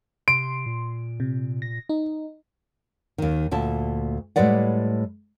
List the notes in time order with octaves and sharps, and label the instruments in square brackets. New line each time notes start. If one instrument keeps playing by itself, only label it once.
[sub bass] C3 [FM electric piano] C6 [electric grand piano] D7
[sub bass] A#2
[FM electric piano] C3
A#6
D#4
[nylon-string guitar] D#2 D#3
D2 A#2 E5 A5
A2 G3 G#3 B4 D5 F#5